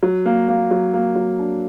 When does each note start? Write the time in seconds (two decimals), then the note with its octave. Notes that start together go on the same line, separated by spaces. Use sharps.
0.03 F#3
0.26 A#3
0.49 A#3
0.71 F#3
0.94 A#3
1.15 F#3
1.39 D4